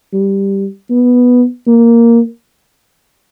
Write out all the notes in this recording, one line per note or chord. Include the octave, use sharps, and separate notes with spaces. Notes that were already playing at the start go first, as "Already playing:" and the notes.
G3
B3
A#3